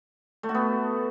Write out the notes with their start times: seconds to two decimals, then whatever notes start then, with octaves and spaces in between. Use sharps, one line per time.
0.43 A3
0.49 F#4
0.55 B3